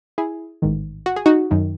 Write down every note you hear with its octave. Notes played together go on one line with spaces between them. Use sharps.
E4 G#4
A1 G#2 D#3
F#4
G#4
D#4 F#4
F#2 D#3